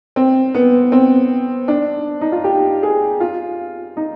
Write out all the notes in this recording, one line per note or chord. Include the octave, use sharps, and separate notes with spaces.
C4
B3
C4
D4
D#4
F4
G4
G#4
F4
D#4